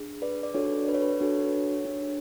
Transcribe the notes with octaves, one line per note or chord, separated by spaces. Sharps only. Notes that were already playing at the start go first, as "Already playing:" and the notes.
Already playing: D4 G#4
B4 D5
D5
D4 F#4 A4 C#5
B4
C#5
B4
D4 F#4 A4 C#5
D4 G#4